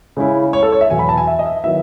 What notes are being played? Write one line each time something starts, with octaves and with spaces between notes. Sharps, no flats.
C#3 G#3 C#4 E4
C#5
A4
C#5
E5
E2 B2 F#3 G#5
B5
A5
G#5
E5
D#5
E5
D#3 F#3 B3 E4 E5